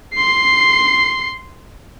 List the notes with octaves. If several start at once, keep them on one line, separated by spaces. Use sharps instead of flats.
C6 C7